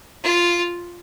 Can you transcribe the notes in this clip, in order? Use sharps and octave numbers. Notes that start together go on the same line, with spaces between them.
F4